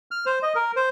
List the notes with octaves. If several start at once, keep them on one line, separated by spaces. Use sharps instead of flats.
F6
C5
D#5
A#4
C5